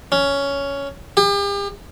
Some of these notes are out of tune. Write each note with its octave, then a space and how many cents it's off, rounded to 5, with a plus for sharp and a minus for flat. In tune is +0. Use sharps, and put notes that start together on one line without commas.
C#4 +10
G4 +40